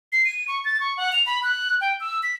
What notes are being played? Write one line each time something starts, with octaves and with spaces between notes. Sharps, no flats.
C7
D#7
C#6
A6
C#6
F#5
F7
B5
F#6
G5
E6
B6